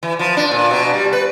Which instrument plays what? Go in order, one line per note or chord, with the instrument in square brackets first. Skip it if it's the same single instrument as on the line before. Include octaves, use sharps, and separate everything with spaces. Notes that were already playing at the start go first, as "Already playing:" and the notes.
[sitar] E3
F3
D4
A#2
B2
G3
B4